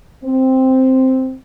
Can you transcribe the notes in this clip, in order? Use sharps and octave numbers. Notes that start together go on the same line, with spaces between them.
C4